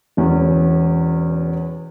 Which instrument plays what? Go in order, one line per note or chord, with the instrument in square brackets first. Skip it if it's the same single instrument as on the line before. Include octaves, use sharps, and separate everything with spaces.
[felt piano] E1 E2 C#4